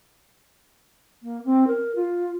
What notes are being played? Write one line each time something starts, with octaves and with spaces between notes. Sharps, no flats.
A#3
C4
A#4
F4